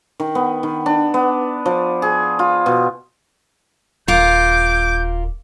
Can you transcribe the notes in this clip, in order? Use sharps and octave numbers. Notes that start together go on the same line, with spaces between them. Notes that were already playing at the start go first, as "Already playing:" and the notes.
D#3
B3
D#3
D4
B3
F3
G#4
F4
B2
D#1 F4 A#4 D6 G6